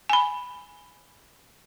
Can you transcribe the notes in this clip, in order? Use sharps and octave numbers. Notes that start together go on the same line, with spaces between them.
G#5 B5